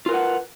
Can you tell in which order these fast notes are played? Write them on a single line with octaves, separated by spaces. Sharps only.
F4 A#4 B4 F#5